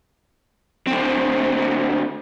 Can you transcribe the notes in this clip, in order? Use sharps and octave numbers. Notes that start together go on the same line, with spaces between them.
D2 C4